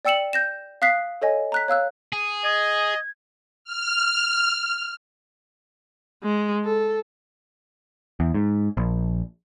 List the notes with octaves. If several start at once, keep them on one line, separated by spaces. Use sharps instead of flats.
D5 G5 E6 C#7 E7 F#7
G6 A#6 E7
F5 D#6 F#6 B6 C7
A4 C#5 D#5 G#5
A#5 F#6 B6
C#5 F5 E6 F#6
G#4
D#5 G#6
F6
G#3
A4
E2
G#2
A#1